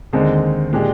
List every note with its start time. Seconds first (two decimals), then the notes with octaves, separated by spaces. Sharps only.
0.13 D#2 D3 G#3 C4 D#4
0.73 A#2 G#3 D4 G4